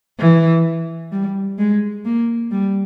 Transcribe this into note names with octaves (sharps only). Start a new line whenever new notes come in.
E3
G3
G#3
A#3
G3